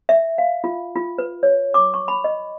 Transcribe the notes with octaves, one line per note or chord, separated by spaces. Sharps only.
E5
F5
F4
F4
B4
C#5
D6
C#6
B5
D#5